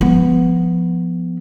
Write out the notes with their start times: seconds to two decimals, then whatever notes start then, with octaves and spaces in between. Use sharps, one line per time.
0.01 F3 B3